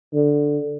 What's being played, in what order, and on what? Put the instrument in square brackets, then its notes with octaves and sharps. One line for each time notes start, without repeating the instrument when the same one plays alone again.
[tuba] D3